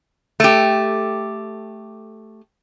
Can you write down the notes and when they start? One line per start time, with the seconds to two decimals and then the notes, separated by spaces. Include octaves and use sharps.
0.40 A3 G4